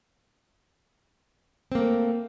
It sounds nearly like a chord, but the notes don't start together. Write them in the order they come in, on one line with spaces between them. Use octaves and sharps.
C4 A#3 A3